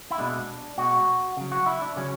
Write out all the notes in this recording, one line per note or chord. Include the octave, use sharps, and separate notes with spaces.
E4
B2 G#3 D4
B2 G#3 F#4
C#3 F#3
F#4
E4
D4
C#3 F#3 C#4